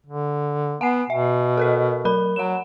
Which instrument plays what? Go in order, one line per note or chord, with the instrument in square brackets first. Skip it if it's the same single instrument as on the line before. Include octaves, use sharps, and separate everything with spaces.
[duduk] D3
[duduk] B3 [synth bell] F#5 G#5 C7
[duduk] B2 [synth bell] E5
[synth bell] A4 A#4 D#5
F#3 A#4 B5
[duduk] F#3 [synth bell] F#5 E7